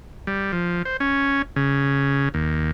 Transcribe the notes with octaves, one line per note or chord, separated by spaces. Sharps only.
G3
F3
C5
C#4
C#3
D#2